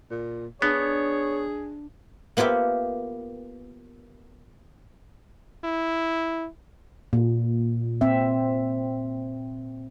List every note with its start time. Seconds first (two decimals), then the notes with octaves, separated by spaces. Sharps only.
0.11 A#2
0.62 B3 D4 G#4 C#5
2.37 A#3 B3 F4 G4 E5
5.64 E4
7.13 A#2
8.01 C4 E5